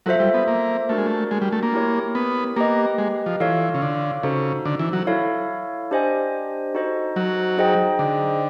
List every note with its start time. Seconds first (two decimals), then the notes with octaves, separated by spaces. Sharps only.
0.06 F#3 F4 A4 C5 E5
0.20 G3
0.34 B3
0.48 A#3
0.89 A3 D4 F#4 A#4
0.98 G#3
1.06 A3
1.31 G#3
1.42 G3
1.52 A3
1.63 A#3
1.74 E4 G4 A#4 C#5
2.15 B3
2.56 A#3 G4 B4 D#5
2.98 G#3
3.26 F3
3.40 E3 F4 A4 C#5 F5
3.74 C#3
3.82 D3
4.23 C#3 D#4 F#4 A4 C5
4.65 D3
4.79 E3
4.93 F#3
5.07 E4 A4 C#5 F5
5.91 D4 G4 C5 D#5 G#5
6.74 D#4 F#4 A4 C5 D#5
7.16 F#3
7.58 D#4 G#4 C5 D#5 G5
7.99 D3